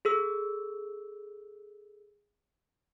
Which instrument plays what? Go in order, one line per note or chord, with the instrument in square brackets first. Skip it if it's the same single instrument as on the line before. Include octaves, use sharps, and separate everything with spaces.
[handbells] G#4 A4 E6